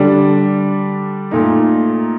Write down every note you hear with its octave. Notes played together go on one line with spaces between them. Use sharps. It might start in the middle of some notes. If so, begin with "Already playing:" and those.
Already playing: D3 G3 D4
A#2 A3 D#4